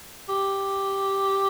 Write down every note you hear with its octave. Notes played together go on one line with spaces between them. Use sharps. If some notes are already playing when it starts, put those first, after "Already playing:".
G4